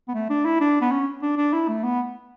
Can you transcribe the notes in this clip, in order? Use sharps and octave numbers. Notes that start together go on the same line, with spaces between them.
B3
A3
D4
E4
D4
B3
C#4
D4
D4
E4
A3
B3